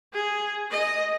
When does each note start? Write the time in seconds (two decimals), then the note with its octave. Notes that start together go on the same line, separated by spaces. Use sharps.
0.13 G#4
0.71 D#5